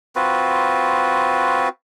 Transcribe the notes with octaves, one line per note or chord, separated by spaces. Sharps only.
C4 F4 F#4 B4